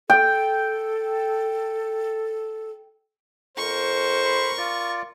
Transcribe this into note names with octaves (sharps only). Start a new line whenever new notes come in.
A4 G5
F2 A#4 C5 C#6
B5 C6
F4 D5